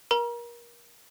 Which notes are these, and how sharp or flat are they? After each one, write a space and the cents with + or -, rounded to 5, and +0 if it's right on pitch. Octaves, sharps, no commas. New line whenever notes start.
A#4 +30 A#5 +35